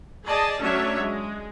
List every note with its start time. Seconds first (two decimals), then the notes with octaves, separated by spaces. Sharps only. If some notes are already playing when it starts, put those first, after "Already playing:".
0.24 G#4 D5 D#5 A5
0.59 F#3 A3 C#4 D4 C#5 E5
0.99 G#3